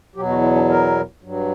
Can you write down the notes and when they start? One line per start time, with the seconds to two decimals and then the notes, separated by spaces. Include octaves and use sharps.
0.15 E2 B2 F#3 G4
0.29 F#4
0.42 E4
0.55 D4
0.69 A#4
1.22 G2 F#3